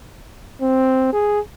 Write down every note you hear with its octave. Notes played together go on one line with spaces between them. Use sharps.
C4
G#4